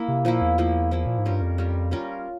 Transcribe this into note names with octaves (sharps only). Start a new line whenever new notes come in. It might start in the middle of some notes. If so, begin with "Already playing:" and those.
Already playing: A#3 E4
C3
A#2 F3 A#3 E4
E2
F3 A#3 E4
F3 A#3 E4
A#2
G#2
G2 G3 C#4 F4 A#4
F2
G3 C#4 F4 A#4
G3 C#4 F4 A#4